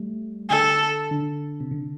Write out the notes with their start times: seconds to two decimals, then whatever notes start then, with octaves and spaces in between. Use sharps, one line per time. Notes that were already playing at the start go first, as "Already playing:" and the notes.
Already playing: G3 A3
0.50 D3 A4
1.11 D3
1.60 C3
1.71 D3